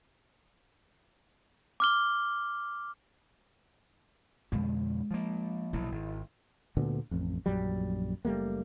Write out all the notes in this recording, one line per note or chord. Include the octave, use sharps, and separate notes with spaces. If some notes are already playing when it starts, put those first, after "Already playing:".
D6 F6 G7
F2 B2 D3 G#3
F3 A#3
A#1 B2 F#3 E4
G#1
D2 A#2 D3 B3
A1 F2
A#1 F#2 F#3 G3
F#1 G3 A3 A#3